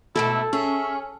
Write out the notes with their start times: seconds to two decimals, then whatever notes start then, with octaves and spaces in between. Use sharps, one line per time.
0.16 G#2 B2 A3 E4 A4
0.53 C#4 G#4 E5